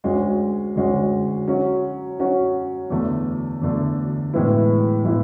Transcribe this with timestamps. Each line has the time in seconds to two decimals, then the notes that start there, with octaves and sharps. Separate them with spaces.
0.04 D2 D3 G#3 C#4 F#4
0.76 D2 D3 G#3 C#4 F#4
1.47 F#3 C#4 F#4
2.19 F#3 C#4 F#4
2.90 E2 D3 A3
3.61 E2 D3 A3
4.33 A2 E3 G#3 B3 E4
5.04 A2 E3 G#3 B3 E4